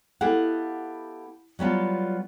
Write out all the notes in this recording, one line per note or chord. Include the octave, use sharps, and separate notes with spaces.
B3 E4 G4 A4 F5 F#5
F#3 G3 B3 F4